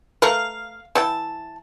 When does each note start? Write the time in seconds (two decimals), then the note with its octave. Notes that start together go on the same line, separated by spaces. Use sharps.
0.22 A3 A#4 B4 F5
0.95 E3 E5 G5 A5